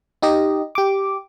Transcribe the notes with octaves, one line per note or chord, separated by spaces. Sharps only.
D#4 G4 D#5
G4 D6